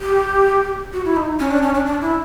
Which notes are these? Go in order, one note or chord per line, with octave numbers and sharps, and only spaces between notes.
G4
F#4
E4
D#4
C#4
D4
C#4
D4
D4
E4